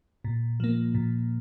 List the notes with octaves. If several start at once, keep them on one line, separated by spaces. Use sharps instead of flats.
A#2
F3 A#3
A#2